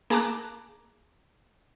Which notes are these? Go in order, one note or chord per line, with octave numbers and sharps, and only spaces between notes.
A#3 G#4 A5 A#5 D6 F#6